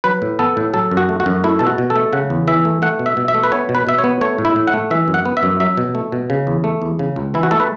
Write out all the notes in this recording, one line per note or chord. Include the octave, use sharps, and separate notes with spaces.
F#3 B4
A2
B3 A4
A2
F#3 A4
F#2
F#4
A3
F#4
F#2
A3 E4
B2 A4
F#4
B2
A4
A3
C#3 F#5
E2
E3 E5
A3
A3 F#5
B2
E5
B2
E5
A3
B4
B3 C#5
B2
B4
B2 E5
C#5
B3
A3 C#5
A2
E4
A2
F#5
A3
E3 E5
F#2
F#5
B3
E5
F#2
F#3 E5
B2
A3
B2
C#3
E2
A3
E2
C#3
C#2
E3 E4
F#4
A3 A4
B4